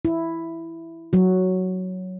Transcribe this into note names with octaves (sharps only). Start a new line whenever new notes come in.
E4
F#3 F#4